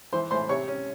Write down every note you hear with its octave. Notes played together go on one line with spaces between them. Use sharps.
E3 C5 C6
A2 C5 C6
C3 C#5 C#6
C#4